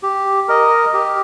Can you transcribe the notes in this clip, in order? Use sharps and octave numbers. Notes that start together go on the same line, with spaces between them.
G4
A#4 D#5
G4